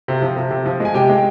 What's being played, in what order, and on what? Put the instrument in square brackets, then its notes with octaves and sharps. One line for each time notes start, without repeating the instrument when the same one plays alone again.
[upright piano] C3
F3
C3
C3
F3
G#3 G#5
C3 G4 G5
G#3